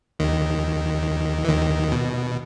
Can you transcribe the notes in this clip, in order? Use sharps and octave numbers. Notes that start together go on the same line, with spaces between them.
D#2 D#3
E3
D#2 D#3
B2